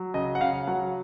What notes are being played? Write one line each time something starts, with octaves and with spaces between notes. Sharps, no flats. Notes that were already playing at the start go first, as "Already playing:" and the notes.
Already playing: F#3
C#3 D#5
F#5
C#3 F5
F#3 F#5